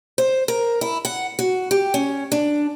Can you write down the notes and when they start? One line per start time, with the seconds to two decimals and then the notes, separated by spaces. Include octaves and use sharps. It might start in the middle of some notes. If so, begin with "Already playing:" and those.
0.18 C5
0.48 A#4
0.81 E4
1.05 F#5
1.39 F#4
1.71 G4
1.94 C#4
2.32 D4